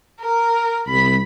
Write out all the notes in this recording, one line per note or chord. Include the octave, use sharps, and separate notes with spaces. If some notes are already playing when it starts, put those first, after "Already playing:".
A#4
C2 B5